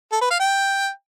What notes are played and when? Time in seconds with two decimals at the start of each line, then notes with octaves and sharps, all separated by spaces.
0.12 A4
0.21 B4
0.31 F5
0.40 G5